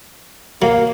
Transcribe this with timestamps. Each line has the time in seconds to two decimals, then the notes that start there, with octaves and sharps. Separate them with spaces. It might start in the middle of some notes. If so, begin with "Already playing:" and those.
0.62 F#3 A#3